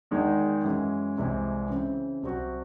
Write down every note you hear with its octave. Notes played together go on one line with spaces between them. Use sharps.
E2 D#3 G#3 D#4
F#2 E3 G#3
C2 C3 E3 G#3 C4
C#3 E3 C4
C2 C3 F#3 C4 F#4